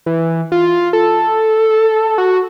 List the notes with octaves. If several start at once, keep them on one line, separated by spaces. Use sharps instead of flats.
E3
F4
A4
F#4